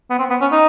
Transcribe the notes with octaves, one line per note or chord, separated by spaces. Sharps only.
B3
C4
B3
C#4
D#4